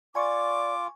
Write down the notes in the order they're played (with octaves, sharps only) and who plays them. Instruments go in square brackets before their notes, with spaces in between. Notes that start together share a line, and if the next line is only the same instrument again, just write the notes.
[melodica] F4 [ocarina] D5 [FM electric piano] G#5 C#6 [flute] D6